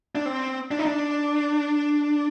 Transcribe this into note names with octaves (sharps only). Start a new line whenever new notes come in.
D4
C4
D4
D#4
D4